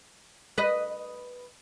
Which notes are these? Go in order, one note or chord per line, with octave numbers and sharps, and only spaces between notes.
B4 D#5